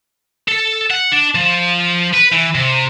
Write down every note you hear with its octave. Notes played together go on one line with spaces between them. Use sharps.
A4
F#5
D4
F3
B4
E3
C3